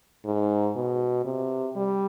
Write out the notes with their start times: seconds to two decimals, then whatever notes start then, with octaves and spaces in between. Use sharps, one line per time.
0.25 G#2
0.76 B2
1.25 C3
1.76 G3